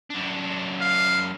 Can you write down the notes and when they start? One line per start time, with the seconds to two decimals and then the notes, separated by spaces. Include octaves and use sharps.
0.10 F#2 D4
0.81 F5